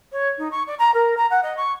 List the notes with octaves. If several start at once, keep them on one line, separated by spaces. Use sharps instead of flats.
C#5
D#4
C#6
D5
A#5
A#4
A#5
F#5
D#5
C#6